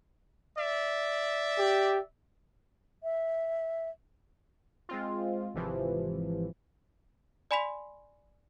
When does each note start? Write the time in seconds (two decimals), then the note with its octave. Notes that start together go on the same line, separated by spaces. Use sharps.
0.57 D5 E5
1.58 G4
3.03 E5
4.89 G#3 C4 F4
5.54 G#1 C3 E3 F3
7.51 D5 G#5 B5 C6 B6 F7